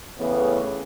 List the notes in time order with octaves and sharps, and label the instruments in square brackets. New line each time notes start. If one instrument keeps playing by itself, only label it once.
[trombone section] E2 A2 C#3 B3